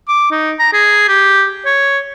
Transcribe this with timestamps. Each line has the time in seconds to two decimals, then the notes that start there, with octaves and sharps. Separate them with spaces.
0.08 D6
0.31 D#4
0.59 A#5
0.73 G#4
1.08 G4
1.66 C#5